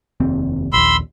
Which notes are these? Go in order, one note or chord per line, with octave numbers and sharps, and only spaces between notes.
F1 D#2 C4
A#1 D#2 B5 C6 E6